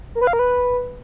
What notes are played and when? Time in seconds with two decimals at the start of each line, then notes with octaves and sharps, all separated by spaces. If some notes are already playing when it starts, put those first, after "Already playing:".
0.15 A#4
0.21 B4
0.27 F5
0.33 A#4
0.39 B4